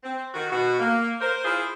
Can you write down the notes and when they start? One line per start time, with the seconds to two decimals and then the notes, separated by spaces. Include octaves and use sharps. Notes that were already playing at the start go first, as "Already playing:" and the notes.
0.04 C4
0.34 D#3 F#4
0.51 B2 F#4
0.79 A#3
1.21 A#4 C5
1.44 E4 F4 G#4 C5